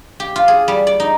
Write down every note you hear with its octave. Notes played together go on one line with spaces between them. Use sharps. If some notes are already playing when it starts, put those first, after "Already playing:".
G4
F4
G#4
G3
D5
D#4